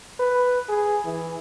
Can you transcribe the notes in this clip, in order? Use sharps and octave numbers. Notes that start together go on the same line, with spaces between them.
B4
G#4
E3